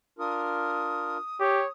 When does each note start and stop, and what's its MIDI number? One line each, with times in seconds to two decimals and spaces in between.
0.19 1.18 62
0.19 1.18 65
0.19 1.18 70
0.19 1.72 87
1.40 1.62 67
1.40 1.67 73